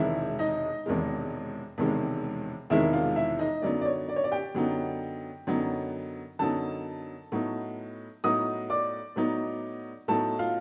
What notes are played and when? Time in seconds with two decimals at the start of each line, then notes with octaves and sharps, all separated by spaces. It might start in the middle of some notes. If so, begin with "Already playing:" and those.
Already playing: E1 E2 C3 D#3 G#3 E4 E5
0.39 D#4 D#5
0.86 E1 E2 C3 D#3 G#3
1.78 E1 E2 C3 D#3 G#3
2.70 E1 E2 C3 D#3 G#3 E4 E5
2.93 F4 F5
3.16 E4 E5
3.39 D#4 D#5
3.62 F#2 D3 F#3 B3 D#4 D5
3.81 D5
3.86 C#5
4.09 D5
4.16 C#5
4.24 D5
4.31 G4 G5
4.55 F#2 D3 F#3 B3 D#4
5.47 F#2 D3 F#3 B3 D#4
6.39 F#2 D3 F#3 B3 D#4 A4 A5
7.32 A2 F#3 B3 D#4
8.24 A2 F#3 B3 D#4 D#5 D#6
8.70 D5 D6
9.16 A2 F#3 B3 D#4
10.08 A2 F#3 B3 D#4 A4 A5
10.39 F4 F5